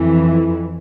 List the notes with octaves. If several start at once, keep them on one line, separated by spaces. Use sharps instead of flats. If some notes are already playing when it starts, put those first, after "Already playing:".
Already playing: F2 E3